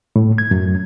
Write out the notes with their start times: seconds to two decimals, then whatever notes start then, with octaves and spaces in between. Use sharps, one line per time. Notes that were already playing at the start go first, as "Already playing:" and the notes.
0.16 A2
0.38 G#6
0.51 F#2